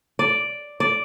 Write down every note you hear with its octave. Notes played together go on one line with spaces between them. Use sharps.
D5
D5